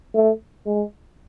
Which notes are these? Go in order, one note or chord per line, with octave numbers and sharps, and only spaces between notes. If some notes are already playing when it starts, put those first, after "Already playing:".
A3
G#3